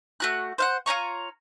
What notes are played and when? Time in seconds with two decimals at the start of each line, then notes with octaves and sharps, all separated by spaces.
0.20 A3 F#4 F#6
0.58 C5 F5 F#5
0.86 F4 C#5 A#5 C#6